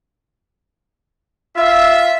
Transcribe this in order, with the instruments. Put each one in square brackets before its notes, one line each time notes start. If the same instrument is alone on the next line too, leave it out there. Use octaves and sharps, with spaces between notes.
[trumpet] F4 [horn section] E5